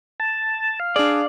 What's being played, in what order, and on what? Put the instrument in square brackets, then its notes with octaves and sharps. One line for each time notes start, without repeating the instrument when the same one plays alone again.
[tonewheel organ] A5
F5
[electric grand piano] D4 G#4 [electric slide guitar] D5